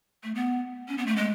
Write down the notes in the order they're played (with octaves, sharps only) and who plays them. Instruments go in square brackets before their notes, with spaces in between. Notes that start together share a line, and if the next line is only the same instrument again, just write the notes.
[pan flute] A3
B3
C#4
B3
A3
G#3